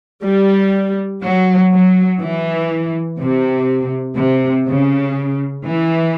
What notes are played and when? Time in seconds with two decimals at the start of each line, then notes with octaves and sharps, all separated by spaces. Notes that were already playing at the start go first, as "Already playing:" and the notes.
0.24 G3
1.22 F#3
1.71 F#3
2.21 E3
3.19 C3
4.17 C3
4.66 C#3
5.65 E3